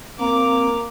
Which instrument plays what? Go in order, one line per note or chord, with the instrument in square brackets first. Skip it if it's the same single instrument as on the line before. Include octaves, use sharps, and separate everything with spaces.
[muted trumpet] A#3 [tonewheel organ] C4 [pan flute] A#5 [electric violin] D6